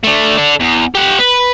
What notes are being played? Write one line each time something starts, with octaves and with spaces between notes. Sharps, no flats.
A3 D4
D4 A4
E2
G4 F#5
B4